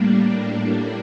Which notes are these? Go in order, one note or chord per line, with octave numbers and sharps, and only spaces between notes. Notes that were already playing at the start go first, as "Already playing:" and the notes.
Already playing: A2 G3 A#3 D4